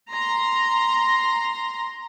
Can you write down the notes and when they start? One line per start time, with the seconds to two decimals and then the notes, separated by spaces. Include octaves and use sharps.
0.11 A#5 C6